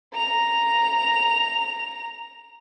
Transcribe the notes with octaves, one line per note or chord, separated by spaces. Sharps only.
A#5 F7